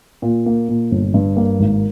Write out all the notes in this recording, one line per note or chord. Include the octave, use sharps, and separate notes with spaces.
A#2
A#3
A#2
G1
G2
A#3
G#1